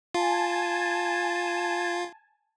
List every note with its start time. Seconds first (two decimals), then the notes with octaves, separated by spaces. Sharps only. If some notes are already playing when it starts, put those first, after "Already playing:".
0.14 F4 G#5 A5